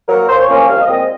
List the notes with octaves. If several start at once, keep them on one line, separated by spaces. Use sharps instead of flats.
F#3 A#3 A#4
A#2 C5
C#5
F3 A#3 C#4
C2 F5
D#5
A#2 G#3 C4
D#5